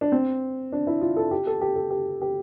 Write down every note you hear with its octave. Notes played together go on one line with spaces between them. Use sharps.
D4
C4
D4
E4
F4
A4
G4
A4
G4
A4
G4
G4